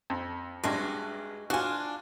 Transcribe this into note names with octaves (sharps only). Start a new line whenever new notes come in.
F2
A1 G2 G#3 F#4 G5
D4 F4 F#4 G#5